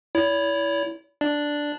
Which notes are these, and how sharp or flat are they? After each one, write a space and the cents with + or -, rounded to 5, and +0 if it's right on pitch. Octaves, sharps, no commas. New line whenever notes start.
E4 +0 C#5 +45
D4 +0 D5 +0